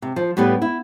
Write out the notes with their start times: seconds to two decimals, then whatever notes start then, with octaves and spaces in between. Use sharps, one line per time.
0.02 C3
0.16 F3
0.37 A2 G3 B3 G4 B4
0.62 E4